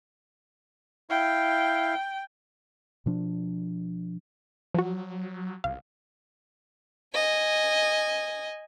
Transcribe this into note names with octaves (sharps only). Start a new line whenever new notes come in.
E4 F5 G5
B2 F3 D4
F3 F#3 F#4
C2 F5
D#5 G#5